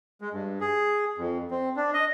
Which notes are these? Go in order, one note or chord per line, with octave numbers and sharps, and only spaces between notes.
G#3
G2
G#4
F2
C4
D4
D#5